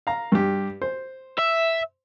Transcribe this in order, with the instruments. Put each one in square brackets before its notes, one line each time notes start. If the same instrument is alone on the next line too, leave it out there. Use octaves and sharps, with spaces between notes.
[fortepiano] F5 A#5
G2 G4
C5
[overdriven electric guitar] E5